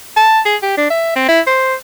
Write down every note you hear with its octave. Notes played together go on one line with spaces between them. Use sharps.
A5
G#4
G4
D4
E5
C4
E4
C5